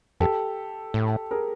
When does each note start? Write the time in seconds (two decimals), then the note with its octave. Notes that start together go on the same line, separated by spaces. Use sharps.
0.20 F2 G4 A4
0.94 A2
1.31 G#4 A#4